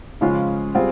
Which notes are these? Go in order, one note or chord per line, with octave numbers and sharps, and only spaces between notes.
C#3 F3 G#3 C#4 F4
G3 C4 F4 G#4